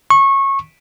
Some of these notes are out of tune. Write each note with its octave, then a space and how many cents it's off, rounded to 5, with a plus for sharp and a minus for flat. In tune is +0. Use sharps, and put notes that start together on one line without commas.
C#6 -20